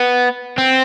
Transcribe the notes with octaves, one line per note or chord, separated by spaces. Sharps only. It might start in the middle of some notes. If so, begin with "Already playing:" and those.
Already playing: B3
C4